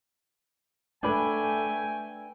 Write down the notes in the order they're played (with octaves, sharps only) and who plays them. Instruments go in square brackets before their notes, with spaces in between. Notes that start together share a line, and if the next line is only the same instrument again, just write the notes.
[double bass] A3 [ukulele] D4 B4 [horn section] G5 G#5